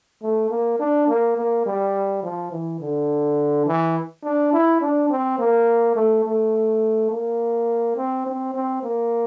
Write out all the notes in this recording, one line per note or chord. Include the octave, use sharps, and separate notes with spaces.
A3
A#3
D4
A#3
A#3
G3
F3
E3
D3
E3
D4
E4
D4
C4
A#3
A3
A3
A#3
C4
C4
C4
A#3